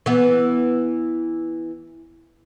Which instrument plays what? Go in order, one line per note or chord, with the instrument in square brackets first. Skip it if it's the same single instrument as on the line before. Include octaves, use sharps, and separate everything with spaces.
[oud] E3 B3